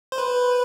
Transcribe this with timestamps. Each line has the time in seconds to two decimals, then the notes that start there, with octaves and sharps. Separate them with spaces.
0.12 C5
0.18 B4